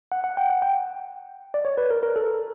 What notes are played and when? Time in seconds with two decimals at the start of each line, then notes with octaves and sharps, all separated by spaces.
0.12 F#5
0.24 F#5
0.37 G5
0.50 F#5
0.62 G5
1.54 D5
1.65 C#5
1.78 B4
1.91 A#4
2.03 A#4
2.16 A4